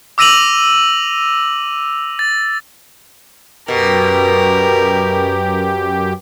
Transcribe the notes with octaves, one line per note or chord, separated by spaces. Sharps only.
D6 E6 A#6 D#7 F7 F#7
A6
F#2 B2 G4 A#4